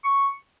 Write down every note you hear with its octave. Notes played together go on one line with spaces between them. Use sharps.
C#6